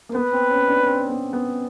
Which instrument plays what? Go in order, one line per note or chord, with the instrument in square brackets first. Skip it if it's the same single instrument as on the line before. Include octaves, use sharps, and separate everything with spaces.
[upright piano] A#3
[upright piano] B3 [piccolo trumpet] B4
[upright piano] C4
C#4
D4
C#4
C4
B3
B3